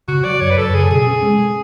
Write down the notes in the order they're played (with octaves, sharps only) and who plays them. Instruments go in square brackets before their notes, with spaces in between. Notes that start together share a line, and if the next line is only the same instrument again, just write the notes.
[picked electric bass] C#3 [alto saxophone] F#4
[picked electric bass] F#3 [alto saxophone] D5
[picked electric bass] F#2 [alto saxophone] C#5
[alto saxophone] B4
[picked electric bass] F#2 [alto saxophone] A4
[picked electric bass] C#3 [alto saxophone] G#4
[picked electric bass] B2 [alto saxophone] G#4
[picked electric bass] C#4
G#3